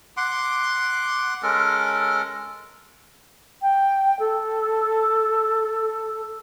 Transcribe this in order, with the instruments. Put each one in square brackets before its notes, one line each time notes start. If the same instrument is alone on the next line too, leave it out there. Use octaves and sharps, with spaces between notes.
[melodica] F#5 C6 D6
G#3 C#4 A4 A#4
[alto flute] G5
A4